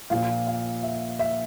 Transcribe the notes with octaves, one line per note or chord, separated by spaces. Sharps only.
A#1 A#2 F3 F5
F5
E5
E5